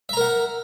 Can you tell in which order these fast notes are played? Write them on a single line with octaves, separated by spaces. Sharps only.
E5 A#5 A#4 F#5